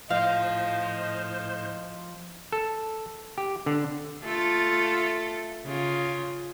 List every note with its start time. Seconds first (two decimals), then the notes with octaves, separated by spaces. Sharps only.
0.10 A2 F3 F4 C5 D#5 F5
2.52 A4
3.38 G4
3.66 D3
4.25 A3 F4 A4
5.65 C#3 F4